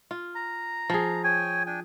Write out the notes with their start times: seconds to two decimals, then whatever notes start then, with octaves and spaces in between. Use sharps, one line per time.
0.11 F4
0.35 A#5
0.90 F3 G#4
1.24 C#5 G5 G#5
1.66 D4 G5 G#5